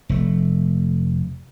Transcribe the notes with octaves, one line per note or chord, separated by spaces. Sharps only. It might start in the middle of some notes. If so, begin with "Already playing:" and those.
F1 A3